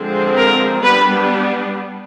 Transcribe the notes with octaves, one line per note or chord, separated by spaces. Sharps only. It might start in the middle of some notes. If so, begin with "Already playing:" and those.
Already playing: D3 F3 G#3 C4
A#4
G3 B3 D4 B4